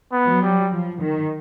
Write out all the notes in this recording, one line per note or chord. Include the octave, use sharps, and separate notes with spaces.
B3
F#3
G3
F3
D#3